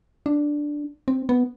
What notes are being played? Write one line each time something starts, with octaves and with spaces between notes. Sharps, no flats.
D4
C4
B3